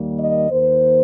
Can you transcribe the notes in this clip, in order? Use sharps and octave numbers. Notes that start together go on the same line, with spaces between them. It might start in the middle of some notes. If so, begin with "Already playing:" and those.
Already playing: D#2 D#3 G3 A#3
D#5
D#2 D#3 A#3 C5